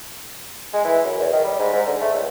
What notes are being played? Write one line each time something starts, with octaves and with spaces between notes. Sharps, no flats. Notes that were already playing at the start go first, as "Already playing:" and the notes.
G#3
E3
F#2
E2
D#3
G3
G#2
G#2
D3
A3
C#2